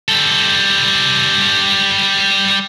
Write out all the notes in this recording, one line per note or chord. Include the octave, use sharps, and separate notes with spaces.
G3 A4